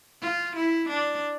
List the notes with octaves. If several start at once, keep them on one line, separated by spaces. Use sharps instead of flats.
F4
E4
D4